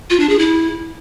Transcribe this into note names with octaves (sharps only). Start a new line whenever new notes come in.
F4
D4
G#4
E4